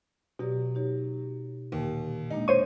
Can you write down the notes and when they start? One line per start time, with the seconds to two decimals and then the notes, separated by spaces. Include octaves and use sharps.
0.39 B2 F#3 G4 D5
0.75 D#4 G4 C#5
1.72 D#2 A#2 D3
2.30 G#3 A#3 D4 D#4
2.48 C5 C#5 C#6 D#7